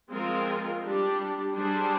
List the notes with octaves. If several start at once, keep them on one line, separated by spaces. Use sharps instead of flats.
F3 G#3 C4 F4 A#4
G3 D4 G4
G3 D4 G#4 C5